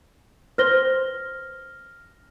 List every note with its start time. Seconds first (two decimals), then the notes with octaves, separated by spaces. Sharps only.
0.58 B4 C5 F6 A#6 G7